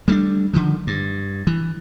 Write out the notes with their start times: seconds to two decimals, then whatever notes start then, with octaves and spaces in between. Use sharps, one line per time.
0.08 G3 A3 B3 D4
0.53 D3 D#3 F3
0.87 G2
1.47 E3